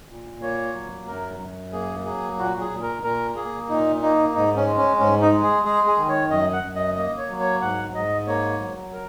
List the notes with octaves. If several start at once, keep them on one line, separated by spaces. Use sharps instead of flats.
A#2
A#3 C#5
F#3
F#2 A#4
F#2
A#3 G#4
F#3 G#4
A#2 F#4
G#4
A#2
A#4
A#2 A#4
A#3 G#4
A#2 D#4
A#3 D#4
G#2 D#4
C#4
G#3
C#4
G#2 C#4
D#4
G#3
G#4
G#3 G#4
G#4
D#3
C#5
F#2 D#5
F#5
F#2
D#5
A#3 D#5
C#5
F#3
C#5
G#2 F#5
G#2 D#5
A#3 C#5
F#3
A#4